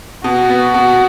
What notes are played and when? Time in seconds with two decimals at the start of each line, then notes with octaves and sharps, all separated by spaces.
0.24 B2 F#4
0.49 B3
0.74 B2